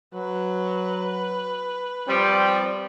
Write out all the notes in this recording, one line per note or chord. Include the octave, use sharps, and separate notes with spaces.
F#3 B4
F3 G3 C4